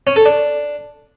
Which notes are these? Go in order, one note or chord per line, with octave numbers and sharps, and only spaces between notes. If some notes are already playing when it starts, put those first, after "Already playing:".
C#4
A4
D4